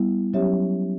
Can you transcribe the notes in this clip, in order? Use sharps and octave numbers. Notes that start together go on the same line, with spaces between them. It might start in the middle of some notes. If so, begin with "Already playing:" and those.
Already playing: G3 B3 E4
F#3 C#4 G4 C#5 E5